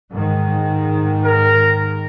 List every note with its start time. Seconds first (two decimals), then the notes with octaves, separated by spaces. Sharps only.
0.12 G#2 D#3
1.25 A#4